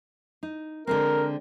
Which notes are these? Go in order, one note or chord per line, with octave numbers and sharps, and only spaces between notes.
D#4
D3 G#3 C4 A#4